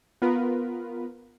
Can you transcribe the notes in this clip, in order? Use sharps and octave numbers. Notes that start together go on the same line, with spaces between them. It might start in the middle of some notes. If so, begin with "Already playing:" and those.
B3 F4 A#4 B4